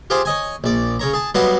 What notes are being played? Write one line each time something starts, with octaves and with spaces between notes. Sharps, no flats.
F4 G4 G#4 C5
C#5 D#5 G#5
A#1 D5
C#3 C#5 A#5
G#4 A5
F#3 G3 B3 D#5 F5 F#5